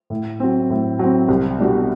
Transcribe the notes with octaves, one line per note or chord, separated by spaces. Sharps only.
A2
F#3 C4
A2
F#3 C4
C2
B2 G3 D4 F#4